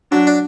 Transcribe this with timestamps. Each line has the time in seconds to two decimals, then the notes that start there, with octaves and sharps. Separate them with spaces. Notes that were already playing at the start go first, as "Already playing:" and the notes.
0.12 F#3 D4
0.27 D4